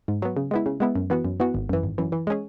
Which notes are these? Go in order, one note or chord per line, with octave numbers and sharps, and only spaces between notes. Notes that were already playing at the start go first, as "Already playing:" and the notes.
G#2
F#3 B3
C#3
G#3 B3 E4
C#3
G#3 B3 E4
F#2
E3 B3 F#4
F#2
E3 B3 F#4
G#1
F#2 E3
G#1
F#2 E3
E3
G#3 C#4 G#4